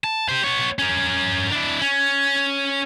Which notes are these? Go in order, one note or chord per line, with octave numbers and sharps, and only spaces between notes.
A5
G4 C5
B3 C#5
C#4 A#4
D4 E4
C#4